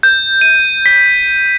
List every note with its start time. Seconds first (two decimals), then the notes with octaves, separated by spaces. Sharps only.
0.03 G6
0.41 D#7
0.86 B6